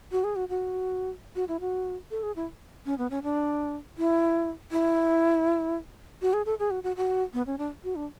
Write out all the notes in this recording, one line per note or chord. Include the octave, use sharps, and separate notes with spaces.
F#4
G#4
F#4
F#4
F#4
E4
F#4
A4
G#4
E4
C#4
B3
C#4
D4
E4
E4
F#4
G#4
A4
G#4
F#4
F#4
F#4
B3
C#4
D4
F#4
D4